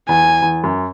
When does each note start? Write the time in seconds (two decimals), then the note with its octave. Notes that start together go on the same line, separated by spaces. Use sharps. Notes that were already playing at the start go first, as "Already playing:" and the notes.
0.08 E2 G#5
0.42 E2
0.64 F#2